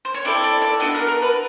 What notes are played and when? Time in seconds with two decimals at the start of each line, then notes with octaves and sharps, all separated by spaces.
0.05 C5
0.14 C#5
0.25 C4 E4 A4 D5
0.44 D5
0.62 D5
0.80 B3 D4 F#4 D#5
0.95 A#4
1.08 A#4
1.22 B4